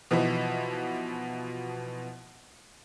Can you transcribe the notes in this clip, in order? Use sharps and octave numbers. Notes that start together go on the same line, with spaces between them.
B2 E3 F3 D#4 E4